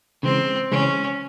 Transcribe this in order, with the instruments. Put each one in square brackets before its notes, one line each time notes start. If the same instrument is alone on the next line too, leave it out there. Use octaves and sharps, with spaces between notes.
[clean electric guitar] C#3 E3 G#3 [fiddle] C4
[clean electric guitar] C#3 E3 G#3 [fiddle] C#4